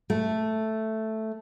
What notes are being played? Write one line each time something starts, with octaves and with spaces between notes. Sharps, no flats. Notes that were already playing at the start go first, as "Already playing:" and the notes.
A3